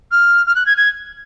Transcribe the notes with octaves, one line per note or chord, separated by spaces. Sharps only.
F6
F6
F#6
G#6
G#6